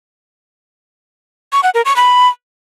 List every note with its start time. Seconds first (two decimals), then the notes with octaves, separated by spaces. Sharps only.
1.52 C#6
1.63 F#5
1.74 A#4
1.85 C#6
1.96 B5